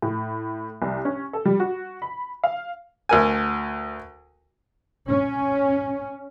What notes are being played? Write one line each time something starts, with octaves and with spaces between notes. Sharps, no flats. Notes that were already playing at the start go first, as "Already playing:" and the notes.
A2
C2
C#4
A4
G3
F#4
B5
F5
D2 A#4 G#5
C#4